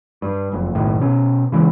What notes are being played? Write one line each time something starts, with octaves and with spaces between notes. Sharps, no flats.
G2
F#1 F2
F#1 B1 A2 D#3
B2 C#4
A#2 C#3 E3 G#3